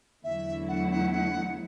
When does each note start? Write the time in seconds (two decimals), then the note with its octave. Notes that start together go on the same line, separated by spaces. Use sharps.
0.24 E2 D3 F#3 A3 E4 E5
0.68 F#5
0.91 F#5
1.13 F#5